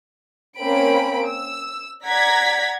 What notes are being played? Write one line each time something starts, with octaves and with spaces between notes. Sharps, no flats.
A#3 C4 C#4 B5 D7
E6
D5 F#5 A#5 G#6 A#6 B6